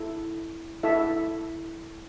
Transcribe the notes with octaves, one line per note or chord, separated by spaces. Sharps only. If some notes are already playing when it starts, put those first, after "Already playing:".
Already playing: E4 A4
E4 A4 E5